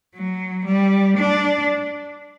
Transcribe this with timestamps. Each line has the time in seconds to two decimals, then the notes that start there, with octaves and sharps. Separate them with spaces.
0.15 F#3
0.65 G3
1.17 D4